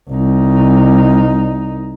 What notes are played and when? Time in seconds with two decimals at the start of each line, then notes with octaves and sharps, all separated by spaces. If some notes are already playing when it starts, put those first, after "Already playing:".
0.10 C2 D#4